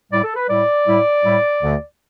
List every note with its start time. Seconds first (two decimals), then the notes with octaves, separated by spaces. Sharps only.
0.11 A2 G3 E4 D5
0.23 A4
0.36 B4
0.48 A2 G3 E4 D5
0.86 A2 G3 E4
1.23 A2 G3 E4
1.61 D2 D3 A3